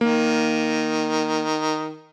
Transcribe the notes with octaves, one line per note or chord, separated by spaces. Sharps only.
D#3 A#3